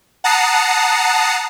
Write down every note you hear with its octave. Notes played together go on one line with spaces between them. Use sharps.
F#5 A5 A#5 D#6 C7 C#7